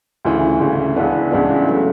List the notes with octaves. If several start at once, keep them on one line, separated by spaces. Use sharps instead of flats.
D2 C#3 E3
D2 C#3 E3
C#2 C#3 E3 B3 D4
C#2 C#3 E3 B3 D4
C#3 F#3 A3